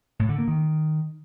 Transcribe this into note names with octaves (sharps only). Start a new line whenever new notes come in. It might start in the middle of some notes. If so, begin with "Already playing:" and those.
A2
D3
A#3
D#3